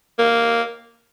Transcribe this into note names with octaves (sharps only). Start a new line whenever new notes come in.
A#3